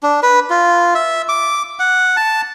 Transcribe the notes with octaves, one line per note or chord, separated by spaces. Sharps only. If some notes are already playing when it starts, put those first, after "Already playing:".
D4
B4
F4
E5
D6
F#5
A5